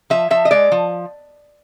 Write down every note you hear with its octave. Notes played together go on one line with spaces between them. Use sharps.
F3 E5
F3 E5
D#5
G#3 D5
F3